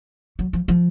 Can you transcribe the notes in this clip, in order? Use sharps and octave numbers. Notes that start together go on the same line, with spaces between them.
F#3
F3
F3